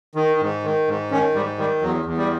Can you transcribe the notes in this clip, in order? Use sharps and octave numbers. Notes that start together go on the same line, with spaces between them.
D#3
G#2
D#3
G#2
D#3 C#4
G#2 G3
D#3 G3
E2 F#3
E2
G3